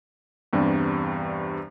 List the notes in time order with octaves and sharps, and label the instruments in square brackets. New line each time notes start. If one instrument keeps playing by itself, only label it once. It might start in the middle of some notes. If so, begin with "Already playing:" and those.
[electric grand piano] E2 G2 C3 G3